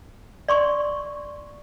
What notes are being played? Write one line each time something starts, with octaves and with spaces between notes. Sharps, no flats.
D5 C6 C#6